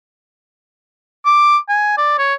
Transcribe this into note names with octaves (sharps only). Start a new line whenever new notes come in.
D6
G#5
D5
C#5